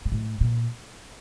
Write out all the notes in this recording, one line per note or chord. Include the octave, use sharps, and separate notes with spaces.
A#2
A2
A#2